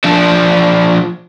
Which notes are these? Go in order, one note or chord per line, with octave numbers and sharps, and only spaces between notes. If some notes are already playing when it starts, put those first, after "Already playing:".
F3 D4